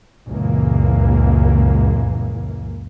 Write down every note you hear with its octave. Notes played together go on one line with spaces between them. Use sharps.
C#2 F#2 A#2 E3 A#3